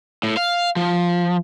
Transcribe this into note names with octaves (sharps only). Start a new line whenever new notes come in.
A2
F5
F3